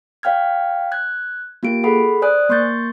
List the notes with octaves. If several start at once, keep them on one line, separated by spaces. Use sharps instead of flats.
C#5 F5 G5 F6 G#6
F#6 G#6
A#3 F4 G4 D7
G#4 A4 F#5 B5
C5 D5 G#5 D#6 F#6
A#3 C6 C#6 G6 A6